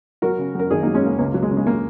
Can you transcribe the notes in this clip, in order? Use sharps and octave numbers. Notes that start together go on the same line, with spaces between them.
F#3 F#4 A#4
C#3
F#2 A#4
G#1 D#4 G#4
A#3 D#4
F#3
G#3 C#4
C#3 A#3
C#2 A#3
F#3
G#3
C#3
G#3
A#3